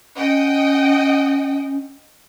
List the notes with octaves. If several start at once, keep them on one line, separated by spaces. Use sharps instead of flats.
C#4 D#5 F#5 G5